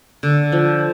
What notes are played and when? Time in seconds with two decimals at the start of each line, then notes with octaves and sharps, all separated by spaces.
0.23 D3
0.52 F3